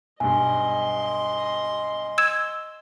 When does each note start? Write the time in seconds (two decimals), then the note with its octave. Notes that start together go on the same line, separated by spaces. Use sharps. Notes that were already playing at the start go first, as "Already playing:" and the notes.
0.20 B1 G2 D#5 G#5 C6
2.18 E6 G#6 E7